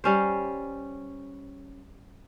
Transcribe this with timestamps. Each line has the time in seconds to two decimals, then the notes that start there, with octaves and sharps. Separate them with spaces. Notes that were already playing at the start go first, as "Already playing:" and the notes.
0.04 G3 C#4 C5